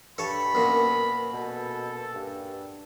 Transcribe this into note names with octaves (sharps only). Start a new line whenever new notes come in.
G2 A4 C#5 A5 B5
F#2 A#2 B3
B2 A4
G2